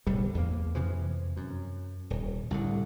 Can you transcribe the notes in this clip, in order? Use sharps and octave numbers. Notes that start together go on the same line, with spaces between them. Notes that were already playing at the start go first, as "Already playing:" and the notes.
D1 B1 D3 G3
E2 A#3
F2 C3 E3 F3
F#2
D#1
C2 A2 D3